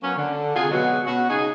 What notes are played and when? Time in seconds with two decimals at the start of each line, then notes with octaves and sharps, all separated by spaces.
0.02 F#3 A#3 B3 C#4
0.16 D3
0.54 C3 F4 F#4 G#4
0.71 B2 F#3 G#3 B3 F#4
1.05 B2 C#4 F#4
1.30 C#3 D#4 G#4